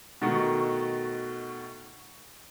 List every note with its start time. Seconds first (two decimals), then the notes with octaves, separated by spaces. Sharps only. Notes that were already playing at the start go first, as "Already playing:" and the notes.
0.21 B2 D#3 A3 F#4